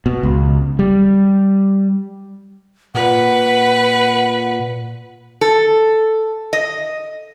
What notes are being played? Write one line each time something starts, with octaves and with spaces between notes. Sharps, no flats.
B2
C#2
G3
A#2 B4 F#5
A4
D#5